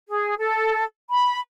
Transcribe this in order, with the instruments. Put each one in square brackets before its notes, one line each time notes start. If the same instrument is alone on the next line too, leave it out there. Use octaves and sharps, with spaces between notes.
[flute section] G#4
A4
B5